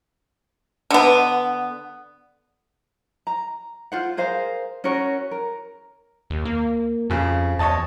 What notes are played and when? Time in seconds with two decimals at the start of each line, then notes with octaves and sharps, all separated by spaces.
0.90 D3 B3
3.27 A#5
3.92 F4 C5 F#5
4.17 G#4 A#4 C5 F5
4.84 C#4 F#4 A#4 C#5
5.31 A#4
6.30 D#2
6.45 A#3
7.10 F2 C#3 F3
7.59 E2 C#5 D#5 A5